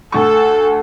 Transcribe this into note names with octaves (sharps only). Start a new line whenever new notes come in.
D2 A4 C#6